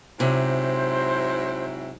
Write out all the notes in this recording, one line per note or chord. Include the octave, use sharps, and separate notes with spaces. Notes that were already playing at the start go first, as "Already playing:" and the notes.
G#2 C3 F#3 E4 C5